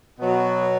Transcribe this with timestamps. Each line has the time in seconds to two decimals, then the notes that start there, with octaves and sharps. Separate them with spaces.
0.20 B2 F#3 B3